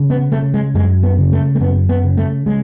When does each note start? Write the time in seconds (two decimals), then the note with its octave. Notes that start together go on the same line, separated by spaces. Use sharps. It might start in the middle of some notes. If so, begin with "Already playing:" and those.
Already playing: C#3
0.10 B3
0.32 C#3 A3
0.54 G#3
0.74 F#2 G#3
1.03 B3
1.18 C#3
1.33 A3
1.55 A3
1.60 F#2 B3
1.89 B3
2.04 C#3
2.17 A3
2.46 C#3 G#3